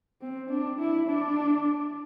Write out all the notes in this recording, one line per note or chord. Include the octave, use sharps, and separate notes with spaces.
C4
D4
E4
D4